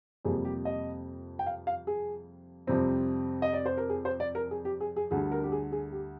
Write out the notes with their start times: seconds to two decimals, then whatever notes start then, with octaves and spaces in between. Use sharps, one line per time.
0.25 F2 C3 G3 A#3 G#4
0.45 G4
0.65 D#5
1.39 G5
1.46 F5
1.67 F5
1.87 G#4
2.67 F2 C3 G3 C4
3.42 D#5
3.53 D5
3.66 C5
3.77 A#4
3.89 G#4
4.05 C5
4.20 D5
4.35 A#4
4.51 G#4
4.65 G4
4.81 G#4
4.96 G#4
5.11 D2 D3 G3 G#4
5.32 A#4
5.44 G4
5.52 G#4
5.72 G#4
5.92 G4